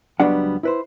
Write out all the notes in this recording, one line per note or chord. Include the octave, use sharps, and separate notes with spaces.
C#2 F#3 G3 B3 D4 F#5
E4 B4 C5